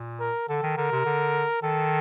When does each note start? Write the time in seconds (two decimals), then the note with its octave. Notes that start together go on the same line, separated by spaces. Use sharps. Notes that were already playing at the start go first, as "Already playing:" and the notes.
Already playing: A#2
0.20 A#4
0.49 D3 A4
0.63 D#3
0.77 D3 A#4
0.92 C3
1.06 D3
1.63 D#3 A4